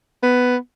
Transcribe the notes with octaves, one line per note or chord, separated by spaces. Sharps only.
B3